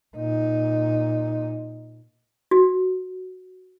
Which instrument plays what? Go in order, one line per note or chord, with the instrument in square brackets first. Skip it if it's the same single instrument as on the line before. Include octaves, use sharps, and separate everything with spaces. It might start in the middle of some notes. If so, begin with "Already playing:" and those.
[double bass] A#2 D#4
[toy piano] F#4